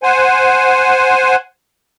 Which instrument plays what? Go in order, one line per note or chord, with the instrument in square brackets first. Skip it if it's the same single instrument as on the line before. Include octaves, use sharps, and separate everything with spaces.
[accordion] C5 F#5 G#5